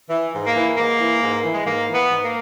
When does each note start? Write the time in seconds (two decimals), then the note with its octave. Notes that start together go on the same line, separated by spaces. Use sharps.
0.10 E3
0.32 G#2
0.47 A#3
0.55 E3
0.77 G#2 A#3
0.99 E3
1.21 G#2
1.43 E3
1.54 G#3
1.66 G#2 A#3
1.88 E3
1.95 B3
2.10 G#2
2.24 A#3